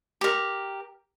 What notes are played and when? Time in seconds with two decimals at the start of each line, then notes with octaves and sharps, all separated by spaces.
0.21 G4 A#4